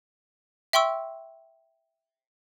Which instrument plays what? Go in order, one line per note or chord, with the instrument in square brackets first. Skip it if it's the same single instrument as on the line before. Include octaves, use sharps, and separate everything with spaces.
[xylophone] E5 G5 C6 C#6 E6